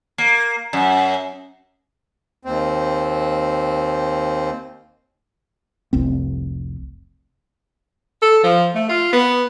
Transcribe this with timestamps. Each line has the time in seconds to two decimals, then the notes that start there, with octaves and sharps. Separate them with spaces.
0.18 A#3
0.73 F#2
2.45 D#2 C4
5.93 F1 C2 C4
8.22 A4
8.43 F3
8.74 A3
8.89 F4
9.13 B3